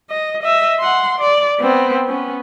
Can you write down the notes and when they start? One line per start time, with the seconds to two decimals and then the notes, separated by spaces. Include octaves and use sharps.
0.10 D#5
0.43 D#5 E5
0.79 F#5 C6
1.19 D5
1.60 B3 C4
2.08 B3 C#4